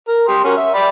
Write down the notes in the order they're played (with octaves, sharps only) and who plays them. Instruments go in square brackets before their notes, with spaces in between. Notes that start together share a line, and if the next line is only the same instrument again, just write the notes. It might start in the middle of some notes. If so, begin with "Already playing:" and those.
[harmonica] A#4
G4 C6 D#6
C#4 F#4 A#4
E5
D5 G5 B5